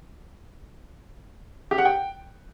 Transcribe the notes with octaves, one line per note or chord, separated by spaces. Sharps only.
G4
F#5
G5